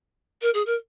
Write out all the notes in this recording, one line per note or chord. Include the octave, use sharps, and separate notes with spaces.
A#4
G#4
A#4